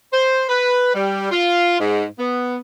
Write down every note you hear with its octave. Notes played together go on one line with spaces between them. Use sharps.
C5
B4
G3
F4
G#2
B3